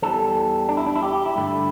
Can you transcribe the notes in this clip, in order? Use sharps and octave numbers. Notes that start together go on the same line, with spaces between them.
E2 E3 G3 A4
D4
E4
D4
E4
G4
G4
E4
G2 D3 A3